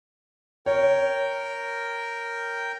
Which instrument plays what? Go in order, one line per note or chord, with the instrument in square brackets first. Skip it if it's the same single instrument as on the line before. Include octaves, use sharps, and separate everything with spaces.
[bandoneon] A#4 G5 [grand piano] C#5